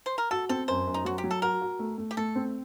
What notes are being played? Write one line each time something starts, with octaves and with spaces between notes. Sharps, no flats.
C5
A#4
F#4 A4
C4 A4
F#2 C5
F#2
D#4
F#3 F#4
G4
F#3
A4
F#4 A#4
F#4
A3
A3
G4
A3 A4
C4